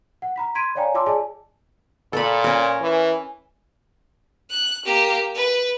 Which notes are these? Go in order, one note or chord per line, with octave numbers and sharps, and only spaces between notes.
F#5
A#5 B5 B6
B5 C6 G#6 B6 D7 D#7
C#5 D5 F5 G5 G#5 A#5
F4 C#5 A5 C6 D6 E6
G#4 D5 D#5 G#5 A5
A#2 A4 B5
C#4 A#4
E3
F#6
A#3 G4
B4